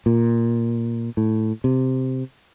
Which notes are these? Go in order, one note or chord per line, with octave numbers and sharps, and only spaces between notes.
A#2
A2
C3